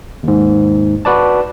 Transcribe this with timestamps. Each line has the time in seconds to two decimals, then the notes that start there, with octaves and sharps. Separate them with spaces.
0.23 D#2 G#2
1.05 F#4 B4 D5 A5